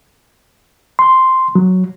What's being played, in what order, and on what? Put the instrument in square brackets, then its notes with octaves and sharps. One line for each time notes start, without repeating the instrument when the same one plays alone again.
[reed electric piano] C6
F#3